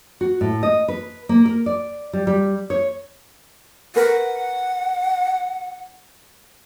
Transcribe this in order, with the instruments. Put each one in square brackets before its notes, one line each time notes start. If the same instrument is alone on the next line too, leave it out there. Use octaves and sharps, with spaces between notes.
[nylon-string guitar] F#4
A2
D#5
B4
A#3
A#4
D5
G3
G3
C#5
[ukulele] A#4 B4 [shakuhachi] F#5